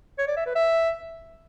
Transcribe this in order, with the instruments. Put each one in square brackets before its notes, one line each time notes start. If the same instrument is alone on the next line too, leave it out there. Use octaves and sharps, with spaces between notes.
[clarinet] C#5
D5
E5
B4
E5